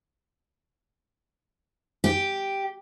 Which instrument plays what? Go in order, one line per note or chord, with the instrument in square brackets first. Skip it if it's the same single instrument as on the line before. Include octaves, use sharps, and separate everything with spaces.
[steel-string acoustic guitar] G4